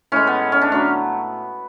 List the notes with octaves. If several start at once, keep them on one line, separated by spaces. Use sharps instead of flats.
A2 E3 G#3 C#4
B3
C#4
D4
D3 F#3 A3 C#4